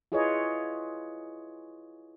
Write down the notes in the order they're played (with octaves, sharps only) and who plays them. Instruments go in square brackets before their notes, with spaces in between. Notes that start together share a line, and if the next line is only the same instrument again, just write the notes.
[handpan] E4 F4 G#4 B4 C#5 D#5